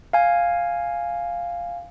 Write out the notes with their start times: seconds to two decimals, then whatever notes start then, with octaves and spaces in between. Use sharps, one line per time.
0.13 F5 G#5